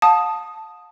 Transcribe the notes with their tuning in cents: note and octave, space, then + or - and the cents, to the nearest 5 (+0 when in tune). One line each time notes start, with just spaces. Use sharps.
F5 +45 A5 +0 D#6 +0